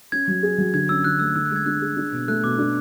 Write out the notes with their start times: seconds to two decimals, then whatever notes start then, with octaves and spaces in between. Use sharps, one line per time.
0.12 C#4 G#6
0.27 F#3
0.43 G#4
0.58 F#3
0.74 D3 G#6
0.89 C#4 E6
1.04 D3 F#6
1.19 A3 E6
1.35 D3 E6
1.46 F#6
1.51 G#3 G#6
1.66 D4 F#6
1.81 G#4
1.97 D4
2.12 B2
2.28 A3 F#6
2.43 B2 D6
2.58 D4